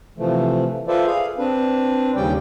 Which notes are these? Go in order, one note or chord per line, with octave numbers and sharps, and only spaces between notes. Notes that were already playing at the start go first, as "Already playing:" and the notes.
C3 E3 F3 A3
F4 A4 B4 C5 D5 E5
G#4 F5
C4 D4 B4
D#2 C#3 G3 C#4 D5 G5